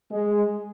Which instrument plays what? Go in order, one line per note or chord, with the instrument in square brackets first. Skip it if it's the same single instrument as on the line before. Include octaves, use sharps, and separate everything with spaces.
[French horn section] G#3